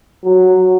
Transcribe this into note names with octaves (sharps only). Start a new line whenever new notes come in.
F#3